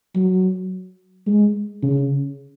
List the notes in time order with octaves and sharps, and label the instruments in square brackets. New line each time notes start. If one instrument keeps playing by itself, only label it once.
[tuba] F#3
G#3
C#3